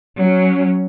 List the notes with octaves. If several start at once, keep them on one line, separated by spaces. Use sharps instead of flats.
F#3 C#4